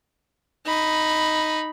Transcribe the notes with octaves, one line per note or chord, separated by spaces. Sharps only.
D#4 B5